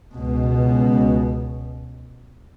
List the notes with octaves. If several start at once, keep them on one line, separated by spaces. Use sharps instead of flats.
C#2 B2